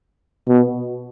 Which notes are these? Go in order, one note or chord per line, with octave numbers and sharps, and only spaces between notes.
B2